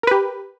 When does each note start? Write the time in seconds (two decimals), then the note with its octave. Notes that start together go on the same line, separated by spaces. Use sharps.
0.03 A#4
0.07 B4
0.11 G4